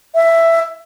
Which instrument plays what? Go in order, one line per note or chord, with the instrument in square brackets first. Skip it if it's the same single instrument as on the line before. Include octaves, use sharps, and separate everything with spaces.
[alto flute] E5